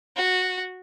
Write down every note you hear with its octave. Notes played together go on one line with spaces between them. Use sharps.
F#4